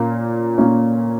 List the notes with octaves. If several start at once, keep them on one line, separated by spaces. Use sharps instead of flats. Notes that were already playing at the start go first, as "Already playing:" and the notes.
Already playing: A#2 A#3 C#4
A#2 A#3 C#4